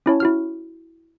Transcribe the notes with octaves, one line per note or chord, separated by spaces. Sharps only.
C#4 E4 C#5 A5
E4 F#4 F6